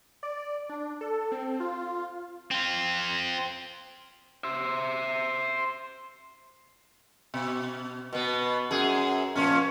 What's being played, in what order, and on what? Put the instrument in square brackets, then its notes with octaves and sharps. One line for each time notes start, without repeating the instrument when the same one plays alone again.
[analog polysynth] D5
D4
A4
C4
F4
[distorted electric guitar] C4 F4
[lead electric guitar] C5 E5
[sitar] B2
B2 B3
F#2 G#4
A#2 F3 C#4